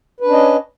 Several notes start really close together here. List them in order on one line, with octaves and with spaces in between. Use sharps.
B4 D4 C#4 D#5